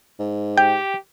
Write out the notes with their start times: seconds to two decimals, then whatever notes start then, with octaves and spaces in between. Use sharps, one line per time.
0.19 G#2
0.58 G4 G5